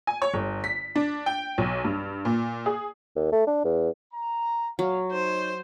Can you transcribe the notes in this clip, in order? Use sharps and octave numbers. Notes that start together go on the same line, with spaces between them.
G#5
C#5
G1
B6
D4
G5
B1
G2
A#2
G#4
D#2
A3
D4
E2
A#5
A#2 F#3 F5
D#4 C5 C#5